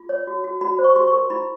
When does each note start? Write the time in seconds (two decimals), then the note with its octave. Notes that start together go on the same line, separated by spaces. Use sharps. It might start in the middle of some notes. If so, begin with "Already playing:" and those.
Already playing: F4
0.09 C#5
0.27 F#4
0.44 F#4
0.61 F#4 B5
0.79 C5
0.84 C#6
0.96 G4 C6
1.08 C#6
1.13 A#4
1.30 E4 B5